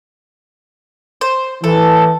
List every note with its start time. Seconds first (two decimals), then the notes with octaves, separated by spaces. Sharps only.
1.21 C5
1.64 E3 A4